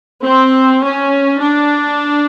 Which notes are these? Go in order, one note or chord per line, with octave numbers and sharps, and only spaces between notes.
C4
C#4
D4